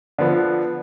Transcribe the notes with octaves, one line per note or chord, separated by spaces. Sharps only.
D3 F3 B3